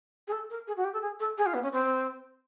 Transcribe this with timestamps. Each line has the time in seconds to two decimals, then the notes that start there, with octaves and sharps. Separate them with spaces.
0.28 G#4
0.32 A4
0.50 A#4
0.67 G#4
0.76 F#4
0.85 G4
0.93 A4
1.02 G#4
1.20 A4
1.38 G#4
1.46 F4
1.54 B3
1.63 C#4
1.73 C4